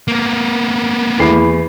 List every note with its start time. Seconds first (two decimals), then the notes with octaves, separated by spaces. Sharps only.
0.08 A#3 B3
1.19 E2 E4 C7